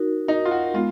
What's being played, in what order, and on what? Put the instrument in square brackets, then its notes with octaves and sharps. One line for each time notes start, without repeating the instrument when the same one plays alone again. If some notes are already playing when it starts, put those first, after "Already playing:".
Already playing: [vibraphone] D#4 F#4 A#4
[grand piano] D#4
F4
F#4
[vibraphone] G#3 B3 [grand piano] F4